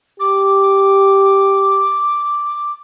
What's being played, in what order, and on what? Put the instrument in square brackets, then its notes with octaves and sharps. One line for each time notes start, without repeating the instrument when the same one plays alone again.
[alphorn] G4 [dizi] D6